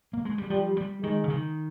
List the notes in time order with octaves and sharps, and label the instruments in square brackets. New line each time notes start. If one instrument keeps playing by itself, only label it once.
[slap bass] A#3
G#3
G3
[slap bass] F3 [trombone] G3
[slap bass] G3
[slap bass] D#3 [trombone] G#3
[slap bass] C#3
D#3